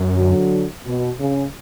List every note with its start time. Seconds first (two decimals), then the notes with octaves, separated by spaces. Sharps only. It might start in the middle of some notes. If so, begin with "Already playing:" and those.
Already playing: F#2
0.17 D3 F#3
0.86 B2
1.20 C#3